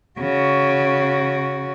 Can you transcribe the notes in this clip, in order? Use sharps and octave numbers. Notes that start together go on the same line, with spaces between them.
C#3 F#4